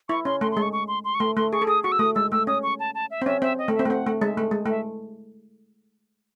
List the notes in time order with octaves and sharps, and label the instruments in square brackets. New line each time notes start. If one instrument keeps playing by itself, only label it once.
[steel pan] E4 [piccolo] C#6
[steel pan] C#4 [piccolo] C6
[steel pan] A3 [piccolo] C6
[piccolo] C6
[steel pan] G#3
[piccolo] C#6
C#6
C6
C6
C#6
[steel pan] A3 [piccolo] C6
[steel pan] A3 [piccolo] C6
[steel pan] G#4 [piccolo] C#6
[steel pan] A4
[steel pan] G#4 [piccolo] D#6
[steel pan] F#4 [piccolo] C#6
[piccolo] E6
[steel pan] A3 [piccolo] D#6
[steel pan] G#3 [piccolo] E6
[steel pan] A3 [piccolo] E6
[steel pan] C#4 [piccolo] D#6
[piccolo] C#6
A5
A5
E5
[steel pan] C4
[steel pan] C#4 [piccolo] E5
[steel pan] C4 [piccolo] E5
[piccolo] D#5
[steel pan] A3
[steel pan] C4 [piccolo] E5
[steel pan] A3
[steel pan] C4 [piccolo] F#5
[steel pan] A3
[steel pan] G#3 [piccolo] E5
[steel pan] A3
G#3
[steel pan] A3 [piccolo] E5